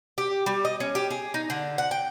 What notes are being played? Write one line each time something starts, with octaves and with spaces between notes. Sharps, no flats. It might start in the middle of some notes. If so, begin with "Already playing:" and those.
G4
G3
D#5
C#4
G4
G#4
D#4
D3
F#5
G5